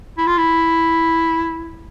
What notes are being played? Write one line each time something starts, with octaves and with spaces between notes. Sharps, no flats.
E4
F4
E4